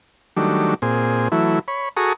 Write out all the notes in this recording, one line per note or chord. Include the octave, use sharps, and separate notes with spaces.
D#3 F#3 G3 A3 D4
A#2 C4 G#4
E3 F#3 A3 E4
C#5 B5
F#4 G#4 A4 A#5 C#6 D#6